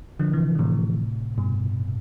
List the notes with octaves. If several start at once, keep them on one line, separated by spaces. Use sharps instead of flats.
D3 F3
C3 E3
D3
A2 C3
G2 B2